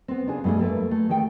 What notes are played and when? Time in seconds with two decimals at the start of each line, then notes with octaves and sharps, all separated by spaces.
0.08 B3 C4
0.26 C#3 D4 G#4
0.44 G2 B2 A3 C4 G#4
0.59 A#3 A4 B4
0.91 A3
1.09 D#3 G#4 A4 G5